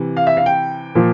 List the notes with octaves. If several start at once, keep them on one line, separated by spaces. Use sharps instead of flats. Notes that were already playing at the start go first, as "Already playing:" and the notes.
Already playing: C3 E3
F5
E5
F5
G5
A#2 F3